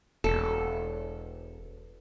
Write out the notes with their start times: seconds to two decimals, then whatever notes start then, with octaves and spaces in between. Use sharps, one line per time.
0.24 E1 A4